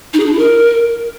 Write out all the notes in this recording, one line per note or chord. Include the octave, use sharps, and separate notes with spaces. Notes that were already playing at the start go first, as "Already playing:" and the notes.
D#4
G#4
D4
E4
A#4